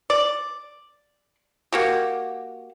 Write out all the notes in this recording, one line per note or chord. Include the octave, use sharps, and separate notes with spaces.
D5
A#3 F#4 G4